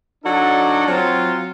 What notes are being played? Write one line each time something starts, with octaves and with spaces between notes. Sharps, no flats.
F#3 D4 D#4 F#4 A4 D5
F#3 C4 F4